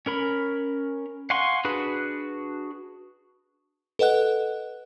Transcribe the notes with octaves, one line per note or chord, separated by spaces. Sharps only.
C#4 A#4 B5
F5 F#5 G#5 C6 C#6
D4 F#4 G#4 B4 B5
A4 B4 D#5 F#5 F#6